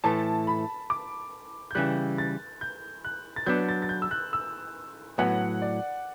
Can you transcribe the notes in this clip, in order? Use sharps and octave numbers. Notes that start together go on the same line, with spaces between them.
A2 E3 A3 A5
B5
D6
G6
C#3 E3 G3 F#6
A6
G6
F#6
A6
F#3 B3 D4 G6
A6
A6
G6
E6
F#6
E6
A2 F#3 B3 F#5
D5